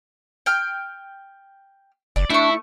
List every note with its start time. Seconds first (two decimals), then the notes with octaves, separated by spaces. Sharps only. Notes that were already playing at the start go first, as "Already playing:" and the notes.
0.46 G5 F6
2.16 F#1 D5
2.30 A3 D4 E4 C#6